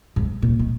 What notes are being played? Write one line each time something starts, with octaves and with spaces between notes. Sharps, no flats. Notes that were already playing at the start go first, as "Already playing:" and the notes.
G#2
A#2
D#3